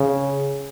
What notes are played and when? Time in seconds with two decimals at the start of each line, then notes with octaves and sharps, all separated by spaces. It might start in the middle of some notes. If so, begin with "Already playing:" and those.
Already playing: C#3